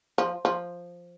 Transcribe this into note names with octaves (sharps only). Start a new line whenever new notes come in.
F3
F3